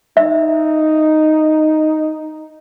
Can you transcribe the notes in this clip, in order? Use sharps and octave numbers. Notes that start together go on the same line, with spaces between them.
D#4 E5